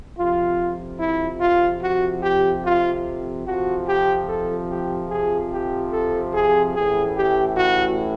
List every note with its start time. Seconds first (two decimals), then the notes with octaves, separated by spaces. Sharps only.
0.17 F2 C3 F3 F4
1.00 E4
1.41 F4
1.82 F#4
2.23 G4
2.64 F4
3.46 F2 C3 F3 F#4
3.87 G4
4.28 A4
4.69 G4
5.10 G#4
5.52 G4
5.92 A4
6.34 G#4
6.75 A1 A2 E3 G#4
7.16 G4
7.57 F#4